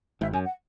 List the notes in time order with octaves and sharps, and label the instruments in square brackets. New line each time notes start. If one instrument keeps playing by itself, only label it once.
[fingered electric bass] G#1 G#2 [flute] E5
[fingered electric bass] F#2 [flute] G#5
[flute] F#5